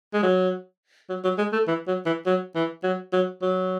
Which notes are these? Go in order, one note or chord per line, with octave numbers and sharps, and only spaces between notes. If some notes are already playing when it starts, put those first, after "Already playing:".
G#3
F#3
F#3
F#3
G#3
A3
E3
F#3
E3
F#3
E3
F#3
F#3
F#3